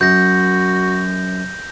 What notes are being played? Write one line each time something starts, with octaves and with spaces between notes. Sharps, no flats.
F#2 F#4 G6 A#6